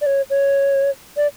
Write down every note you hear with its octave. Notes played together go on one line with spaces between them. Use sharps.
D5
C#5
C#5
D5